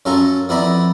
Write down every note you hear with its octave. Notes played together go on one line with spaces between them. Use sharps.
F#2 C#4 F4 A4 A#5 C#6
F2 B3 E4 D5 A#5 B5